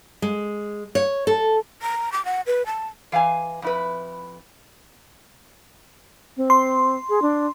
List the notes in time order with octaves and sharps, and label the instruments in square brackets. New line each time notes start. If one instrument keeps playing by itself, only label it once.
[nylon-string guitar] G#3
C#5
A4
[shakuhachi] A#5
D6
F#5
B4
A5
[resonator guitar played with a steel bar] E3 F5 F#5 G#5
F2 E4 B4
[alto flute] C4
[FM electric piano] C6
[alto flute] G#4
D4